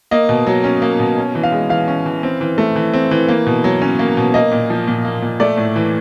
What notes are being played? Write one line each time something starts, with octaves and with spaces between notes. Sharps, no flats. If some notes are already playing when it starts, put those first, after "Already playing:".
A#3 D#5
B2
F#3
C#4
A#3
B2
C#4
E3
F5
G#3
E3 F5
C#4
E3
C4
E3
A3
E3
C4
E3
A#3
B2
F#3
C#4
A#3
B2
A#3 D#5
A#2
F3
A#2
A#3
A#2
A3 D5
A2
E3